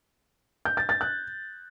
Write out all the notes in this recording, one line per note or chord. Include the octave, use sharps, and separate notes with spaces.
G6
A6
A6
F#6